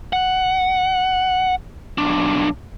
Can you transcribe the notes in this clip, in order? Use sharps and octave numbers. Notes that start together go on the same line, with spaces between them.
F#5
B1 D4